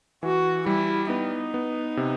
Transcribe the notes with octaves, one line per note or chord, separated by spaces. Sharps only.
E3 F#4
G3 E4
B3 D#4
B3
C3